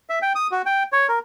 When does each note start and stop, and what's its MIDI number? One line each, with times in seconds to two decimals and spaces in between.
0.10 0.19 76
0.22 0.33 79
0.35 0.47 87
0.52 0.62 66
0.66 0.83 79
0.92 1.07 73
1.09 1.19 70